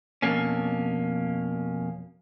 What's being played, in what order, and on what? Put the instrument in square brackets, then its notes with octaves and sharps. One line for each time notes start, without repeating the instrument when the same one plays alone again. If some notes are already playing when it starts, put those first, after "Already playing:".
[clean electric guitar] F2 B2 A#3 C#4